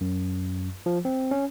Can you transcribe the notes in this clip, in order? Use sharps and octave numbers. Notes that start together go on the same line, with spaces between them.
F#2
F3
C4
C#4